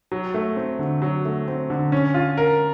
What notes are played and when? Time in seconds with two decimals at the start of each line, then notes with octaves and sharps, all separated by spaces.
0.12 F#3
0.34 A3
0.56 C4
0.79 D3
1.02 F#3
1.25 A3
1.48 C4
1.70 D3
1.92 C#4
2.14 F4
2.37 A#4